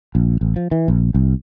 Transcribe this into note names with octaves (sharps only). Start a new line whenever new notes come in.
A#1
A1
F3
E3
A#1
C2